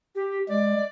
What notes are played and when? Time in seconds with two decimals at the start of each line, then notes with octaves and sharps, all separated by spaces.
0.15 G4
0.49 G#3 D5